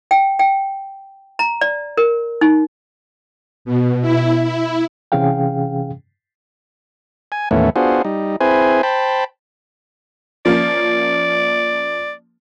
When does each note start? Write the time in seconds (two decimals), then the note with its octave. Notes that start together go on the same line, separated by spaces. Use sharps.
0.11 G5
0.39 G5
1.39 A#5
1.61 D5
1.97 A#4
2.41 D#4
3.65 B2
4.02 E4
4.44 E4
5.12 C3 E3 C#4 G#4 F5 G5
7.32 G#5
7.51 D#2 A2 E3 A3 B3 C#4
7.76 B3 D4 F4 F#4 G#4 C5
8.05 G3 D#4
8.41 C4 E4 G#4 B4 C5 G#5
8.83 C5 G5 A5 B5
10.46 F3 A#3 C#4 D5